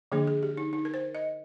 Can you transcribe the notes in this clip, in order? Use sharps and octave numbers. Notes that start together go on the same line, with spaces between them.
D3 F3 A#3 D4 G#4
G#4
G4
D#4
D#4
A#4
C5
D#5